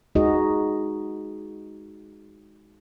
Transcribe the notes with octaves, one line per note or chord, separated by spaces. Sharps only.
G#3 D#4 F#4 G#4 D#5